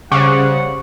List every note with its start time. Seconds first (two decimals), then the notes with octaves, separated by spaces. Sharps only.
0.12 C#3 G3 C5 F#5 C#6 D6